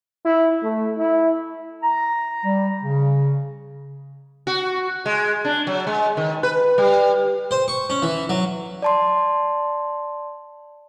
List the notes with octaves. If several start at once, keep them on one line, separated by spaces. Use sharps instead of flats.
E4
A3
E4
A#5
G3
C#3
F#4
G#3
D4
F#3
G#3
D#3
B4
G3
C5
C#6
C#4
E3
F#3
D5 A5 C6